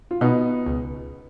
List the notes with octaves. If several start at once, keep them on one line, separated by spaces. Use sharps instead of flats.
F4
B2 B3 D#4
C#2